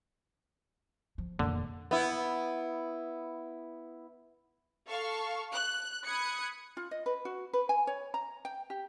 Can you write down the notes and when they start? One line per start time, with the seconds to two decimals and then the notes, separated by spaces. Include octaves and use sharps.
1.18 F3
1.39 F1 A#2 D3 D#3 A#3
1.91 B3 E4
4.89 A4 F5 C#6
5.53 F#6
6.05 B5 D#6 F#6 G#6 C#7
6.77 F4
6.91 D#5
7.06 B4
7.25 F#4
7.53 B4
7.69 G#5
7.87 C#5
8.14 A#5
8.45 G5
8.70 G4